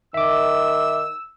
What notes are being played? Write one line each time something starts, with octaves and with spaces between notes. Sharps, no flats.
D#3 E5 D6 E6